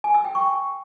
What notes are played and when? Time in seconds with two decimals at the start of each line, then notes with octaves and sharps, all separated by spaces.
0.04 G#5
0.14 E6
0.25 G5
0.35 C#6